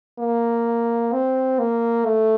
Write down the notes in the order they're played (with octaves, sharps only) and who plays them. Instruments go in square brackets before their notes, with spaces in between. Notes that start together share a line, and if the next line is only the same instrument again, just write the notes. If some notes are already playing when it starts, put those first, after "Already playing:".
[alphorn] A#3
C4
A#3
A3